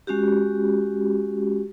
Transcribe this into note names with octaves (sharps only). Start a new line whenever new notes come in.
G#3 C#4 F#4 G4